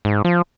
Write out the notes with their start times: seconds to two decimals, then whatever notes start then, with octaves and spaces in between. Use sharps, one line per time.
0.05 G#2
0.25 F3